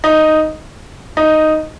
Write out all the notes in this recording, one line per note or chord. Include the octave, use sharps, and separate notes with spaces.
D#4
D#4